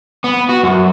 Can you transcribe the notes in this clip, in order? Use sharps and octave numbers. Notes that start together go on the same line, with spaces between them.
B3
F#4
F#2